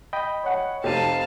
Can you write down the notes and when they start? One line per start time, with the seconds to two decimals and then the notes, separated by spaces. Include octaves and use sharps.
0.13 D#5 G5 B5
0.44 C#5 F#5
0.84 F1 C4 G4 A4 F5 A5 D#7